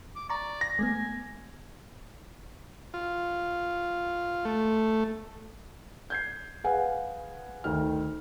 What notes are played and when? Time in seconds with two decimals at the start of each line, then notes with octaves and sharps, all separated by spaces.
0.16 D6
0.30 D5 A#5 C#6
0.61 A#6
0.79 G#3 A3 B3 G#5
2.94 F4
4.45 A3
6.10 G6 G#6 C7
6.64 G#4 B4 F5 F#5 G#5
7.64 D2 D#3 G5 F6